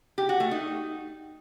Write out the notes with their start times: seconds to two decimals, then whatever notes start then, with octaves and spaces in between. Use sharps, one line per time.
0.18 G4
0.29 F#4
0.40 A3
0.51 D#4